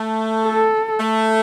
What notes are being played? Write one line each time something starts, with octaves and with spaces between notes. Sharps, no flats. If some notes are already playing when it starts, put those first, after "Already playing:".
Already playing: A3
A4
A3